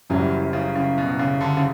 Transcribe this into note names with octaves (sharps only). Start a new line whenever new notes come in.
F#1 F#2 E3 F#3 G3
C#3
C#3
B2
C#3
D3
C#3